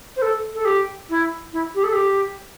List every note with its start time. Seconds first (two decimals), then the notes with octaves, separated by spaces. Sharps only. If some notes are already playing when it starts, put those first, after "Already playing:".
0.16 C5
0.22 A4
0.54 A4
0.65 G4
1.09 E4
1.53 E4
1.75 G4
1.84 A4
1.93 G4